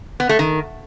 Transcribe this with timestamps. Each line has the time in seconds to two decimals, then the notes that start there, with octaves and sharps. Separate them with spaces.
0.20 B3
0.29 A3
0.39 D#3